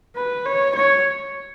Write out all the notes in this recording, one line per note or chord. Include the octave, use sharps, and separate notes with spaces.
B4
C#5
C#5